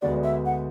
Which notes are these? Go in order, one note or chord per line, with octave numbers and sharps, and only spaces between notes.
D2 D3 G#3 B3 F#4 D5
E5
F#5